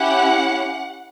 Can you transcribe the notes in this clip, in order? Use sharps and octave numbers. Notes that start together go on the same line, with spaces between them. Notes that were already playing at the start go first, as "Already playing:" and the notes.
Already playing: C#4 E4 G4 F#5